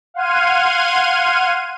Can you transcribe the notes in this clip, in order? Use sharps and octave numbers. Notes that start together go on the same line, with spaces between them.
F5 F#5 C6 F6 G#6 D#7